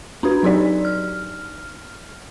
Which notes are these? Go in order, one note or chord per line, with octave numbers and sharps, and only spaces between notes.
C#4 D4 F#4 B4
F#3 D#4 G4 D5
F6